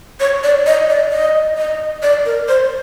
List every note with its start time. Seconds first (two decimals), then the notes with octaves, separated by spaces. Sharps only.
0.20 C#5
0.44 D5
0.66 D#5
0.90 D5
1.12 D#5
1.58 D#5
2.03 D5
2.26 A#4
2.48 C5